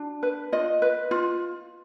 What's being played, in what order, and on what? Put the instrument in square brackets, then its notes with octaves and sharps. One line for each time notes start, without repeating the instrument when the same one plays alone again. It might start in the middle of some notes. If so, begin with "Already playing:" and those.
Already playing: [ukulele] D4 F#4
B4
F4 D#5
B4
F4